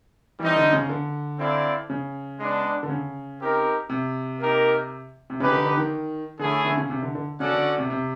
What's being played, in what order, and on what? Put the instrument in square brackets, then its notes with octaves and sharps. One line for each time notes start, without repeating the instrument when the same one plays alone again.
[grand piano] E3 [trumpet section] G3 C4 D#4
[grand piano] D3
C#3
D3
[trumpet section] C4 E4 A4 D5 F5
[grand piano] C#3
[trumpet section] G#3 B3 D4
[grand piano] D3
C#3
[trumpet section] C4 D#4 G4 A#4
[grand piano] C3
[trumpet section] A#3 D#4 G4 A#4
[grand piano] C3
[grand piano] C#3 [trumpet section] D#4 G4 B4
[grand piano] D3
D3
D#3
[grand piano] D3 [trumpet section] A3 C#4 E4 G#4
[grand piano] D3
C#3
C3
D3
D3
[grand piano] C#3 [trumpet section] C#4 F#4 A4 D5 F#5
[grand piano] D3
C3
C3